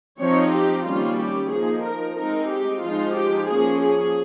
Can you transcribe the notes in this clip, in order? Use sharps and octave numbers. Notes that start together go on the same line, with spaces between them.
F3 C4 D#4 C#5
G4
D#3 G3 A#3 C#4 F4
G4
F3 A#3 D#4 G#4
A#4
G#3 C4 D#4 A#4
G4
F3 G#3 D#4 F4
G4
F3 A#3 C#4 G#4
G#4